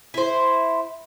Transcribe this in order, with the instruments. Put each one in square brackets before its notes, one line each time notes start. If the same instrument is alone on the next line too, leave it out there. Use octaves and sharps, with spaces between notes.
[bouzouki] E4 C5